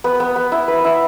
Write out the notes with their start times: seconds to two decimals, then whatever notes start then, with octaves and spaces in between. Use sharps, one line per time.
0.04 B3
0.20 B3
0.36 B3
0.52 E4
0.68 B4
0.84 E4